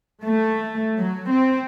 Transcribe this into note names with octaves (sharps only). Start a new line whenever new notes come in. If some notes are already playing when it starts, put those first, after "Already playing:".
A3
F#3
C4